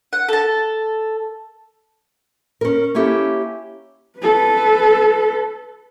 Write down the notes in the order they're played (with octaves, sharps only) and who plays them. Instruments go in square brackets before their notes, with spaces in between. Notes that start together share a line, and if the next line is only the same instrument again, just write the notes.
[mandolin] F#5
A4 A5
[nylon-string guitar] C#4 A#4
A#3 C#4 E4 G4 A4 C#5
[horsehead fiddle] A4 B4